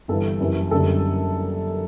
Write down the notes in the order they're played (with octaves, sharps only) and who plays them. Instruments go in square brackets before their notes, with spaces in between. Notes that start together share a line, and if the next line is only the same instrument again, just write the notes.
[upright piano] G1 G2 E3 A4
F#1 F#2 E3 G3
F#1 F#2 D3 G3 A4